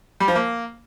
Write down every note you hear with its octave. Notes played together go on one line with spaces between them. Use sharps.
G3
F3
A#3